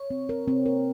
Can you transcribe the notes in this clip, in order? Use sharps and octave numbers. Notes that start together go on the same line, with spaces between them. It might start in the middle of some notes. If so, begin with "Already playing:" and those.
Already playing: C#5
C4
A#4
C4
A#4